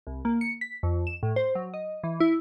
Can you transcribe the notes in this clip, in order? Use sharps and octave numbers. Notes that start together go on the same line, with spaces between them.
C2
A#3
C#7
B6
F2
E7
A2
C5
F#3
D#5
E3
E4